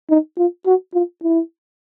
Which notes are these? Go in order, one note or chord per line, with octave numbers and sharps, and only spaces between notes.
D#4
F4
F#4
F4
E4